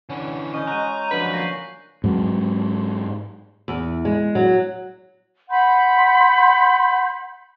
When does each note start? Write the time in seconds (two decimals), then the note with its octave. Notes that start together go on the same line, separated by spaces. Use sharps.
0.09 D3 E3 C#4
0.54 C#4 D#5 C#6 G6
0.68 G#3 F#4 A#5 F#6 G6 D#7
1.11 D3 F3 F#3 B4 B6 F#7
1.33 A#3 A#6 C7
2.04 G#2 F#3
3.68 E2
4.05 G#3
4.35 F#3
5.50 F#5 B5 C6 G6